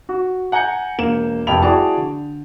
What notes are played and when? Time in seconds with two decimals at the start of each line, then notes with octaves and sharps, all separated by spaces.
0.09 F#4
0.52 F#5 G#5 A#5 G6 C#7
0.98 E1 A#3 E7
1.47 F1 C2 G5 A5 B5 F7
1.62 E4 F#4 G#4 D5 G5 A5
1.97 D3